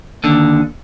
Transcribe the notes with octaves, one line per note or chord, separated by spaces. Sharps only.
D#2 D3